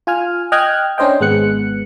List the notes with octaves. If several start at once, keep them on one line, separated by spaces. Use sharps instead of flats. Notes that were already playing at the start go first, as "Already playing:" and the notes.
F4 G#5 F6
D#5 G5 F6 F#6 G#6
C#4 D4 C5 D#5 G5
G#1 G#3 B3 F#6 C#7